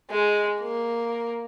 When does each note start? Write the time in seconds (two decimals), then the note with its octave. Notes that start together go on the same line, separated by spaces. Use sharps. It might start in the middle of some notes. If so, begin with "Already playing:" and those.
0.10 G#3
0.60 A#3